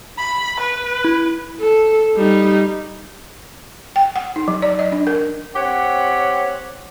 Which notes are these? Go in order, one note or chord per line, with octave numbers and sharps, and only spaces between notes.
B5
B4
E4
A4
G3 D#4
G5
F#5
D#4
F#3
D5
D#5
D4
A#4
C4 G4 C#5 F#5